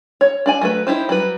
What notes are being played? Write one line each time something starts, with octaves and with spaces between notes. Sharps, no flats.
C#5
D4 D5 G#5
F#3 A3 B4
D#4 E4 G4 C5
F#3 G3 B4